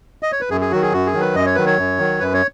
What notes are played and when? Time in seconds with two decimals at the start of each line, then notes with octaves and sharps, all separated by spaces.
0.23 D#5
0.32 C#5
0.41 B4
0.50 F#2 G#4
0.61 G#4
0.71 D#3 F#3 F#4
0.82 G#4
0.92 F#2 F#4
1.07 G#4
1.13 D#3 F#3
1.21 B4
1.35 F#2 D#5
1.46 C#5
1.55 D#3 F#3 B4
1.66 C#5
1.78 F#2
1.99 D#3 F#3
2.20 F#2 B4
2.34 C#5